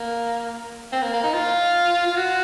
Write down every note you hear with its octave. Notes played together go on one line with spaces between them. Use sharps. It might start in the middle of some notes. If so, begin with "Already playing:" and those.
Already playing: A#3
C4
A#3
A#3
D#4
F4
F4
F#4